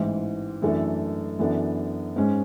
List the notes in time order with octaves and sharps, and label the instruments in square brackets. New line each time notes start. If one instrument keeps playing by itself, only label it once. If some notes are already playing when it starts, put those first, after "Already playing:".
Already playing: [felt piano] A1 G#2 E3
F#2 E3 A3 D4 A4
F#2 E3 B3 D4 A4
G#2 G#3 C#4